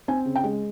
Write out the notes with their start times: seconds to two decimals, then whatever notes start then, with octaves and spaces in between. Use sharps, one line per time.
0.08 C4 G#5
0.26 C#3
0.36 G5
0.44 G#3